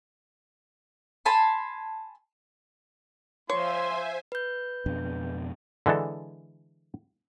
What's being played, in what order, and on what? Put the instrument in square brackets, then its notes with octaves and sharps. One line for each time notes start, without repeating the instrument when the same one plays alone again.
[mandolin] G#5 A5 B5 C6
[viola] F3 F5 [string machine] C5 E5 G#5 [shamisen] C#5 [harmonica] C6
[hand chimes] B4 G6
[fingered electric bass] F2 B2 D4
[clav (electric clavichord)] D3 E3 G#3 D4 A4